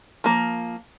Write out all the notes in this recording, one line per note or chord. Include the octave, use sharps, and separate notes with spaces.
F3 A#3